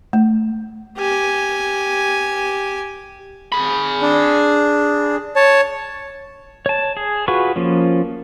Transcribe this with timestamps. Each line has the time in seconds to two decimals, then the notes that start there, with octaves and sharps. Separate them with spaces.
0.13 A3
0.98 G4 G#5
3.52 G#4 B5
4.02 D4
5.36 C#5 A5
6.66 C#5 A5
6.97 G#4
7.28 F4 F#4 G#4 B4 C#6
7.56 F3 A#3 C#4